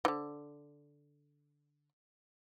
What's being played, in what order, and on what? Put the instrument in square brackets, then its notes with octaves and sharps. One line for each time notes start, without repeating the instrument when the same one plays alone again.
[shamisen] D3 E3